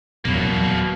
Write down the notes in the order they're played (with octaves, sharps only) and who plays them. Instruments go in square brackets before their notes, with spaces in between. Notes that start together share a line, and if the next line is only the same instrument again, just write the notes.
[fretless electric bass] D#1 E2 F#3 [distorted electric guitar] B2 A#3